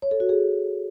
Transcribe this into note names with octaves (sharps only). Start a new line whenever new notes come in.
C#5
A4
F#4
G#4